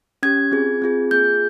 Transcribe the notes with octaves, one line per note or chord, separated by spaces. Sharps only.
C#4 G4 G#6
C4 F4 G#4
C4 F4 G#4
A#3 F4 G#4 G6